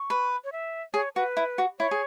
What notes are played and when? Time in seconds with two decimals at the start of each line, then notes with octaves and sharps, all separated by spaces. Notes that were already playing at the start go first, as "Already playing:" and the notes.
Already playing: C#6
0.10 B4
0.44 C#5
0.52 E5
0.94 G#4 C#5
1.15 F#4 B4
1.37 E4
1.58 F#4
1.79 E4 C#5
1.91 G#4